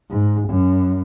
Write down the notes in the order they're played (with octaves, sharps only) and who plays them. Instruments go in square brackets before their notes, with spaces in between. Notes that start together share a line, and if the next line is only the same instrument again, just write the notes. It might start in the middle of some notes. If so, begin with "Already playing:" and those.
[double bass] G#2
F#2